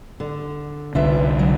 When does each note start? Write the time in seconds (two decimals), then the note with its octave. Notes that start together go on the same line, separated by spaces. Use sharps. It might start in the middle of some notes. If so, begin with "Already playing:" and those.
0.20 D3
0.95 C2 D3 F4 B4 E5
1.39 F#3